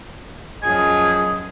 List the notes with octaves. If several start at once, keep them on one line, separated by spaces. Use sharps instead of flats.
F#2 F3 G#4 D#5 G#5